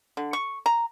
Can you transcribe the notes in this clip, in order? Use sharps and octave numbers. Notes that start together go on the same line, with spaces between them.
D3
C#6
A#5